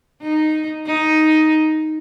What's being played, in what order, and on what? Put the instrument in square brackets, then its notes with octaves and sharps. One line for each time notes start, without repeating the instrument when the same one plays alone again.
[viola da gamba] D#4
D#4